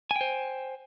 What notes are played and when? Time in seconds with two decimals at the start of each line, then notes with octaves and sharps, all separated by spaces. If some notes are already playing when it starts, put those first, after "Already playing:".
0.11 G#5
0.16 G5
0.21 C5